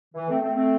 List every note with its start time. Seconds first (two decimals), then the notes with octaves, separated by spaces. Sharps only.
0.15 E3
0.29 A3 C4
0.41 A3 C4
0.55 A3 C4